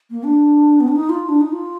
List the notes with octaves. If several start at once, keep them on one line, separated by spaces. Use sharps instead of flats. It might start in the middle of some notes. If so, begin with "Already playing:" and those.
A#3
D4
B3
D4
D#4
F4
D4
D#4
F4